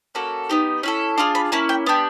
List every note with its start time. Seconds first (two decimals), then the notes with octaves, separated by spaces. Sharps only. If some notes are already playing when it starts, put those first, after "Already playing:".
0.15 A#3 C#4 F#4 A4
0.49 B3 D#4 G4
0.83 C#4 E4 A4
1.18 D4 F4 G#4 C6
1.35 B5
1.52 A#3 C#4 E4 A5
1.69 G5
1.86 B3 D4 G4